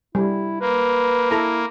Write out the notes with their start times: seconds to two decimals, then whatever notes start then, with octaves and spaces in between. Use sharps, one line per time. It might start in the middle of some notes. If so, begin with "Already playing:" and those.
0.15 G3 E4
0.61 A#3 B4
1.31 E4 A4 A#5